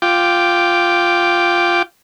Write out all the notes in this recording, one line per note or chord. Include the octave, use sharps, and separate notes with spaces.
F4 G5 D6